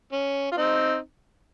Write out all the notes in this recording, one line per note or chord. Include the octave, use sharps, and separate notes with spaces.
C#4
F4
C4 D#4